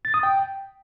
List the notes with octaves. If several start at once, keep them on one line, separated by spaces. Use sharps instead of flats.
A6
D#6
G5